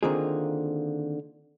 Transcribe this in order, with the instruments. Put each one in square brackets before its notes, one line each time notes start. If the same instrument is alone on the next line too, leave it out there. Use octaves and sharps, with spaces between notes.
[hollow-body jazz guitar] D3 D#3 A#3 C4 F4 G#4